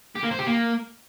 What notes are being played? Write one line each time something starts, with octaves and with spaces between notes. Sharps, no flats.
G4
A#3
C5
G4
A#3